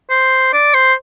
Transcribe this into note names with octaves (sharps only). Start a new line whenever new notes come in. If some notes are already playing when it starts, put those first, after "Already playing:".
C5
D5
C5